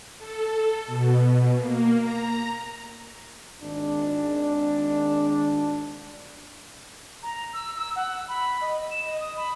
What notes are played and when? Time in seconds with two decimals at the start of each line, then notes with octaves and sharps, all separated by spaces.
0.18 A4
0.86 B2
1.58 A#3
1.99 A#5
3.62 G#1 D4
7.23 A#5
7.54 E6
7.77 E6
7.96 F#5
8.29 B5
8.61 D#5
8.90 E7
9.05 D#5
9.20 D#6
9.37 B5